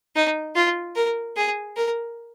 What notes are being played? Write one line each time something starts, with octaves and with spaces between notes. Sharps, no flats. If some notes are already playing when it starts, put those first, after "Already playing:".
D#4
F4
A#4
G#4
A#4